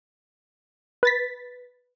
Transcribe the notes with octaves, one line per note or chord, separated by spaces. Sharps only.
B4 A6 B6